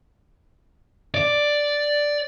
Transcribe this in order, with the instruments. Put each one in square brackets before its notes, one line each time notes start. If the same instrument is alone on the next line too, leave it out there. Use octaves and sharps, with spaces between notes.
[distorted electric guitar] D5